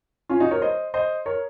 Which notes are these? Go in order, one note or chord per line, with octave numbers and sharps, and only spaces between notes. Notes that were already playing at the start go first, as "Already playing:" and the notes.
C#4 F4
D#4 F#4
A#4 C#5
C5 D#5
C5 D#5
A#4 C#5